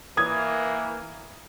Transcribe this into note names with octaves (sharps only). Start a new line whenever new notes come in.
E3 A#3 D#6 G#6